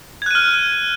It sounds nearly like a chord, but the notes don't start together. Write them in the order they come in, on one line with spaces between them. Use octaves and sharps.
G#6 F#6 D#7 F6